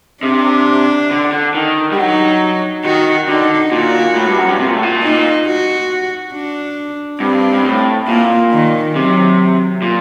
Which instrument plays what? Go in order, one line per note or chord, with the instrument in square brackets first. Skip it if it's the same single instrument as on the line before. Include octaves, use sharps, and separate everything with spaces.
[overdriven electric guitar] C3 [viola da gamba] D4
[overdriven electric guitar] D3
D3
D#3
G3
[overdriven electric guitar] F#3 [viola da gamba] D#4
[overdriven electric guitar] D#3 [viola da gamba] F#4
[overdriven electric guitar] D3 [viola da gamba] D#4
[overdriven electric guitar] A#2 [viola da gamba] F#4
[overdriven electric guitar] A2
G2
F#2
G2
C3
A#2
A2
A#2
[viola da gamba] D#4
F#4
D4
[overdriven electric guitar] G2 [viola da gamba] C4
[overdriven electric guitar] G2
A2
[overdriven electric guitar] A#2 [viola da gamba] A#3
[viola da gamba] D#3
[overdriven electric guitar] C3 [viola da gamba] F#3
[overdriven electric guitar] A#2